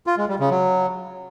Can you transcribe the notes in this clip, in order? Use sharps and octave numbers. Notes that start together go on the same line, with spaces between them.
F4
G#3
G3
C#3
F#3